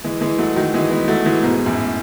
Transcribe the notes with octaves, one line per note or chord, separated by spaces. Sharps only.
E3 G#3
E3 G#3
F#3 A3
D#3 F#3
E3 G#3
G#3 B3
F#3 A3
E3 G#3
G#2 B2
F#2 A2